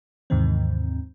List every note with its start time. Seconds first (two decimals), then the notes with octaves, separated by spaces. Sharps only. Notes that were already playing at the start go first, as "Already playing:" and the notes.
0.30 D#2 G#2 C3 D#3 E3 C4